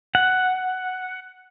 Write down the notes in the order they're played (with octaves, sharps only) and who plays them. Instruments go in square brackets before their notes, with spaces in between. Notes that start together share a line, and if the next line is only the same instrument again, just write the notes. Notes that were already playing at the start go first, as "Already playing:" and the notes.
[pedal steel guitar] F#5